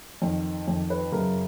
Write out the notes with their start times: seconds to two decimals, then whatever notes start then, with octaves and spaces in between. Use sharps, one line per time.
0.22 F2 D#3
0.68 F2 D#3
0.90 B4
1.12 F#2 C#3 A#4